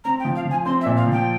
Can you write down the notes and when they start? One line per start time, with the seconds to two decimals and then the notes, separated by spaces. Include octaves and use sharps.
0.05 C4 A#5
0.19 G5
0.25 F3
0.36 F5
0.45 F3
0.50 G#5
0.65 C4 C6
0.81 E5
0.86 A#2
0.97 F5
1.07 F3
1.12 G5